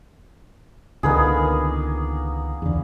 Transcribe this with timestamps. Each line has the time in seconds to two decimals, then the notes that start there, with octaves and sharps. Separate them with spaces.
1.03 C#2 D3 D#3 A#3 B3 G#4
2.62 E2 D3